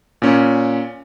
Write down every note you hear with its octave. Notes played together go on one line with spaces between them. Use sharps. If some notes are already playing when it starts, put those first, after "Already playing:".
A#2 C#4